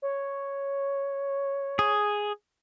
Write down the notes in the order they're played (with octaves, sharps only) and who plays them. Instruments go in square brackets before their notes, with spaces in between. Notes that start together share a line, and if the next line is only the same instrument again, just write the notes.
[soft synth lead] C#5
[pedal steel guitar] G#4